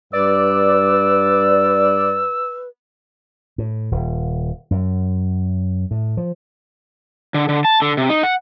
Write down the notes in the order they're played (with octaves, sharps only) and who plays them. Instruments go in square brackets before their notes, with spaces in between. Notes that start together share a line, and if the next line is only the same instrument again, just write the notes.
[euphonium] G2 [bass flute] B4 [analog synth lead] D5 [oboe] E6
[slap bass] A2
D#1
F#2
A2
F3
[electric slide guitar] D3
D3
A5
D3
C3
D#4
F#5